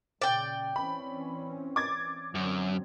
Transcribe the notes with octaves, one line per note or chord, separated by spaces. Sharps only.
A#2 C#3 D5 G5
E3 C4 C#4 B5
D6 G#6 A6
F#2 D3 F#3 C4